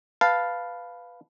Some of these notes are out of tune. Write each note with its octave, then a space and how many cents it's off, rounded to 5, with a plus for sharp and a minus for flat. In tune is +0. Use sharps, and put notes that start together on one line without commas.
B4 +0 F5 +0 A5 +0